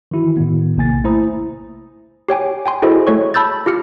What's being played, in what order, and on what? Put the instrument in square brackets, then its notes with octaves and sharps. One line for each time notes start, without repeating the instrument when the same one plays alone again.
[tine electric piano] D#3 E3 E4 F#4
A2 D#3 B3
A#1 C3 A#3 G#5 A6
A3 E4 C5 A#5 D#6
[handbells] G4 C#5 G5 G#5
G5 G#5 C6
E4 F#4 G#4 A4 C5 D#5
A3 A4 C#5 C#6
A5 B5 E6 G6 A6
F4 G4 F6 C#7